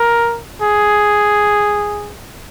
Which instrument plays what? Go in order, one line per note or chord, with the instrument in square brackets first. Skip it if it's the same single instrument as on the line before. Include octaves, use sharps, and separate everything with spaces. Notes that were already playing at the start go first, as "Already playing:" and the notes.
Already playing: [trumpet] A#4
G#4